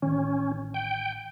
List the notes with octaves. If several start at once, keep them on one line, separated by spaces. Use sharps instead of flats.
A1 D#3 C#4
G5